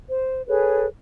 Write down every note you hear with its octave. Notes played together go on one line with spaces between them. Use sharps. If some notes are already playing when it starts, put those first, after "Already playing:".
C5
G#4 A4 B4 C#5